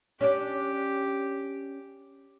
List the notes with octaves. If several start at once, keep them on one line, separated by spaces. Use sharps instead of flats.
C#4 D4 G4 D5